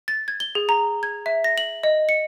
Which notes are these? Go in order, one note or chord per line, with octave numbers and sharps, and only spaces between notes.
A6
G#6
G7
G#4
A#5
G#6
E5
A#6
F#7
D#5
C#7